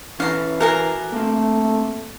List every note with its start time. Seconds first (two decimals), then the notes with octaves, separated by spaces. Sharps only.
0.20 E3 C#4 A4 F5 A#5
0.61 F#4 A4 A#4 F5 G#5 A#5
1.13 A3 A#3 C4